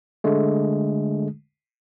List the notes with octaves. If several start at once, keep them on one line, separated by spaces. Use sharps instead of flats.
D3 G#3 A3